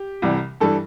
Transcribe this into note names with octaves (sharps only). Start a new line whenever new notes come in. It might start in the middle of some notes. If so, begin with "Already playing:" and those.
Already playing: G4
C2 C3 E3 G3
G2 E3 G3 A4